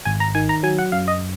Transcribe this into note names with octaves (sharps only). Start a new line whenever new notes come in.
G#1 G#5
A#5
D#3 G#5
A#5
F#3 G#5
F#5
F#2 F5
D#5